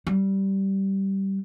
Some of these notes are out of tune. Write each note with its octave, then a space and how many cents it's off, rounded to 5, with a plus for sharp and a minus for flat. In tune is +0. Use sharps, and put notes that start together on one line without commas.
G3 -15